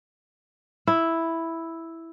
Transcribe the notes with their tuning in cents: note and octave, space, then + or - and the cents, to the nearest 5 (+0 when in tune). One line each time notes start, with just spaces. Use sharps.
E4 +0